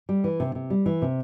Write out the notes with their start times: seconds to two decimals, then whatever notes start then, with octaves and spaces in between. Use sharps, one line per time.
0.09 G3
0.24 E3
0.40 C3
0.55 C3
0.70 G3
0.86 E3
1.02 C3